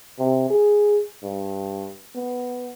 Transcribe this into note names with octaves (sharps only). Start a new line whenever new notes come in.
C3
G#4
G2
B3